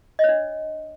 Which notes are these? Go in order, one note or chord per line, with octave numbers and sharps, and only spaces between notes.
D4 C#5 D#5